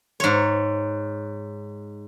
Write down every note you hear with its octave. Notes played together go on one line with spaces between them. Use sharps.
G#2 C#5